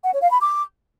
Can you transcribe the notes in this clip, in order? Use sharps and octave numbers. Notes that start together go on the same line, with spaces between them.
F#5
C#5
F5
B5
D6